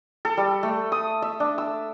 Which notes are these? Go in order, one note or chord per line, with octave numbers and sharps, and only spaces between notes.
A4
G3
A3
D#6
E5
D4
E6